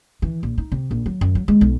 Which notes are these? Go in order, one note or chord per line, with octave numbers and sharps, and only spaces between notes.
E3
A#1
D#4
C3
A#1
F#3
F#2
F#3
G#3
B1